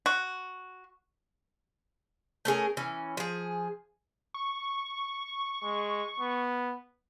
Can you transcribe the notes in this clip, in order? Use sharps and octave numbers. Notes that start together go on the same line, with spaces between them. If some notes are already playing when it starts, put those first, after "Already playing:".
F#4
A3 C#4 G#4 A#4
E3 C#4
F3 G#4
C#6
G#3
B3